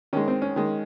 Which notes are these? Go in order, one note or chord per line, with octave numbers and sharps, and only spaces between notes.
D#3 G#3 C#4
C4
C#4
D#3 G#3